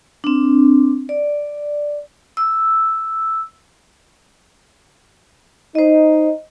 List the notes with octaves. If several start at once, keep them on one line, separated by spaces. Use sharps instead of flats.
C4 D4
D5
E6
D#4 C5 D#5